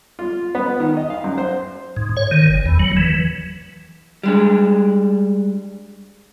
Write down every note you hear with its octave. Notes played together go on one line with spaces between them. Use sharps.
F4
B3
D#3
D#5
F5
F#2
C5
G#2
C#5
D#3
G1
E2
F#3
E3
G3 G#3 D4